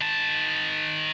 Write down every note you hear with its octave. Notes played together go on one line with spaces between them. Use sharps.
D#3 A5